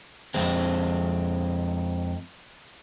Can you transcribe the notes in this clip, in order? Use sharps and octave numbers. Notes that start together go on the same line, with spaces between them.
F2 G#3 C4